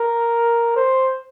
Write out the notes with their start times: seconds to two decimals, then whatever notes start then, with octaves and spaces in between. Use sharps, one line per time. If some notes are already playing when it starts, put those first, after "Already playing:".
Already playing: A#4
0.76 C5